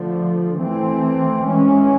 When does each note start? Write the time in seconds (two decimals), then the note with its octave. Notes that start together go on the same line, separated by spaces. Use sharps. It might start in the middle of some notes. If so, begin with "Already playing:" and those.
Already playing: D3 F3 A3
0.60 E3 A3 C4
1.48 E3 G#3 C#4